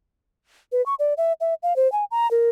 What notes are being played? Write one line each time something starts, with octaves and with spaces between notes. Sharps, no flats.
B4
C#6
D5
E5
E5
F5
C5
G#5
A#5
A#4